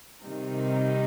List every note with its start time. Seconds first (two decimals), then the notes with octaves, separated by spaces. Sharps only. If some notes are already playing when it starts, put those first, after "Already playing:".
0.21 C3 D#3 G3 C4 D#4